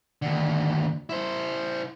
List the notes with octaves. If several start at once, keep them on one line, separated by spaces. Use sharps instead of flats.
D#2 D3
E4 C5